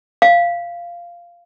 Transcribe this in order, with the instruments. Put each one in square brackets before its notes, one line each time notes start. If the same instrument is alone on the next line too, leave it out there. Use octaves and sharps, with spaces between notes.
[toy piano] F5